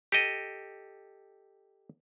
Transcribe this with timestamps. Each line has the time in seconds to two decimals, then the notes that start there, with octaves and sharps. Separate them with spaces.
0.12 G4 A4 D#5